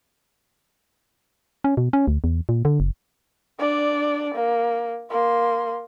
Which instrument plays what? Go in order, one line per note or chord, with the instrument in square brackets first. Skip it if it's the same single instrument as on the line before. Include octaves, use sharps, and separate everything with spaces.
[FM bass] C#4
B2
C#4
D2
E2
A#2
D3
F#1
[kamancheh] D4 D5
A#3
A#3 C6